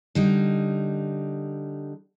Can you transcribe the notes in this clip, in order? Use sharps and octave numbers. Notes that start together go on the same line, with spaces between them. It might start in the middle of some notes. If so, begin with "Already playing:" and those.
D3 G3 D#4